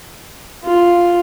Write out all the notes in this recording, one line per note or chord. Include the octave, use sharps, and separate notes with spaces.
F4